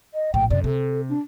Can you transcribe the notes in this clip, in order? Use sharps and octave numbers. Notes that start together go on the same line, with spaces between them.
D#5
A#1 A2 G5
F#2 C3 D5
C3 A4
D4